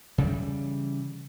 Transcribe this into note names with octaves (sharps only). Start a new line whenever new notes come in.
C#3 E3 G3